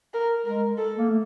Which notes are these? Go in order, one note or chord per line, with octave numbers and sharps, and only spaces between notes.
A#4
G#3 A#4
A4
A#3
A3